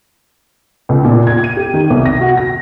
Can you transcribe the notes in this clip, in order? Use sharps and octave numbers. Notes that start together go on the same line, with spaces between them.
C#2
A#2
G#6
D#7
G4
D#3
C2
A#6
F#4
A#6